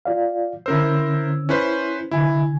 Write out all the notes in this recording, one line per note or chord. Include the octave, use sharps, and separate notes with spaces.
F4 D5 F5
D3 C#4 E4 A#4 C5 E6
C#4 E4 B4 C5
C2 D3 E4 G#5